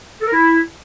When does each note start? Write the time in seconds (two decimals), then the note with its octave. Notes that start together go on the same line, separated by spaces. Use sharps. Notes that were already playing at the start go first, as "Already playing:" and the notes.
0.21 A4
0.27 A#4
0.33 E4